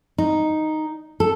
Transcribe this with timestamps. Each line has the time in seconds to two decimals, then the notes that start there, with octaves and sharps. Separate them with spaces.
0.18 D#4
1.20 A4